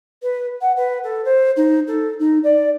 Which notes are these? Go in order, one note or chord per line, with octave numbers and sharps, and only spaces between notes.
B4
F#5
B4
A4
C5
D#4
A4
D#4
D5